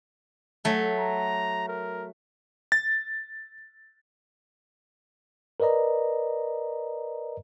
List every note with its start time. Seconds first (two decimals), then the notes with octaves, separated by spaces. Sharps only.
0.65 F#3 A3 A4
0.98 A#5
1.68 A#4
2.72 A6
5.60 A#4 B4 D5 D#5 A#5